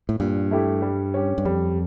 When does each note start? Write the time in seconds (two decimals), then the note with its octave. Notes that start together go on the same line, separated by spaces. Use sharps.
0.09 A2
0.20 G2 A#2
0.51 A3 E4 G4
0.82 G3
1.14 C#4 G4
1.38 G2
1.45 F2 G3